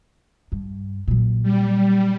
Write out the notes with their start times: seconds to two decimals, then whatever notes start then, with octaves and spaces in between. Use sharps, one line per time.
0.52 G2
1.08 A#2 F#3
1.43 G3